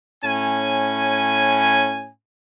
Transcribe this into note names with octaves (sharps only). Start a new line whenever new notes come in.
A2 C#4 G#5